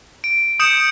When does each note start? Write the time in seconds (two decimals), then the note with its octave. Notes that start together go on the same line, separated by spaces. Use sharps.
0.24 D7
0.60 D#6 G6 C#7 E7